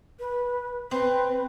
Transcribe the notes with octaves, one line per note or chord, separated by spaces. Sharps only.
B4
C4 B4